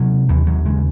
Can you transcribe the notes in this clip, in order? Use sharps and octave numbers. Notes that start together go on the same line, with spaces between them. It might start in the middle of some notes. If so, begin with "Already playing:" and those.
Already playing: C3 F#3
D#2 E3
F#3
C#3 G#3